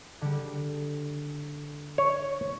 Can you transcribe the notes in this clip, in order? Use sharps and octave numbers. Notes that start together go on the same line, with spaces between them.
D3 G3
C#5